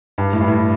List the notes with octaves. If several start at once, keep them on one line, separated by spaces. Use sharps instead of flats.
G2
A2
G2
A2